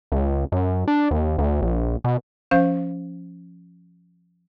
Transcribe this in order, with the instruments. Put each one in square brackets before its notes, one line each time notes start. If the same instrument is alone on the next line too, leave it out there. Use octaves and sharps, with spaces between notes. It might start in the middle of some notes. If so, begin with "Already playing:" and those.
[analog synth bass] C#2
F#2
D4
D#2
D2
A#1
B2
[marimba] F3 C#4 C5 F5 G6